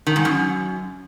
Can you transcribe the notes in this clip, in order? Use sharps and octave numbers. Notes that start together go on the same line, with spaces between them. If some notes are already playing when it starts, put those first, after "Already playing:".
D#3
G#2
F#2